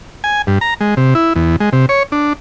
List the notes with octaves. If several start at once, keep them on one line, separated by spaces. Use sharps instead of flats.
G#5
G2
A#5
G#3
C3
E4
E2
G#3
C3
C#5
D4